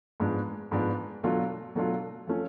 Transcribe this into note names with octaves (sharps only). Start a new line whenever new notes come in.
G#2 F3 G#3 B3 D4
G#2 F3 G#3 B3 D4
B2 F#3 A3 D4 F4
B2 F#3 A3 D4 F4
F3 A3 C#4